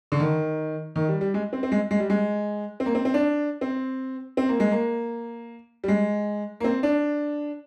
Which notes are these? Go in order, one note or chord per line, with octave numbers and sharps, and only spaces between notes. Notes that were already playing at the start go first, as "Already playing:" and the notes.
D3
D#3
D#3
G3
G3
G#3
C4
C4
G#3
G#3
G3
G#3
C4
A#3
C4
C4
D4
C4
C4
A#3
G#3
A#3
G3
G#3
A#3
C4
D4